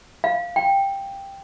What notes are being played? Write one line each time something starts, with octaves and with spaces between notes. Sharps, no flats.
F5
G5